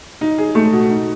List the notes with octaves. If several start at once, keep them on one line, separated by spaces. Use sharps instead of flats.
D#4
G#4
A3
B2
D#4